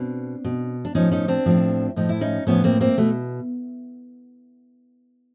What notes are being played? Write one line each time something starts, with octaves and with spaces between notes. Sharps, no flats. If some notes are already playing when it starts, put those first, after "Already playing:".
Already playing: B2 C4 D4
B2
D4
A2 F3 C#4 D#4
C#4 D#4
C4 D4
A2 F3
A2 F3 D#4
E4
C#4 D#4
A2 F3 B3 C#4
A#3 C4
A#3 C4
B2 A3